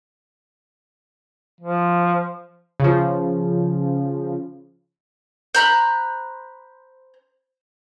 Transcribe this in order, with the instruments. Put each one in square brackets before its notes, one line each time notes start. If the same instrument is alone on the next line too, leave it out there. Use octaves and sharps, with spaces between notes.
[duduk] F3
[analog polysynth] C#3 F3
[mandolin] C5 A#5 B5 F#6